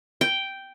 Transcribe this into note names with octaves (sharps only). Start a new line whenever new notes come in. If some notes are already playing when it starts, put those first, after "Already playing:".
G5